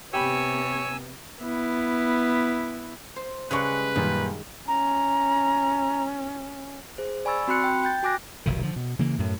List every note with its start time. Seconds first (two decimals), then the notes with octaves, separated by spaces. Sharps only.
0.13 C3 B3 G4 C#5 G#5 B5 E6
1.42 B3 E4
3.16 C5
3.51 C#3 G3 G#3 B4 C#6 F#6
3.96 F#2 A#2 D#3 G3
4.68 C#4 A#5
6.98 G#4 C5
7.25 D5 G#5 B5 C#6 E6 A6
7.48 C4 F#4 B5 C6 F#6 C#7
7.64 G5
7.84 G5 G6 A6
8.03 F#4 G#5 D6 F#6 A#6
8.46 F1 B1 D#3
8.63 D3 F3
8.76 B2
8.99 C#3 E3 A#3
9.18 F#2 A2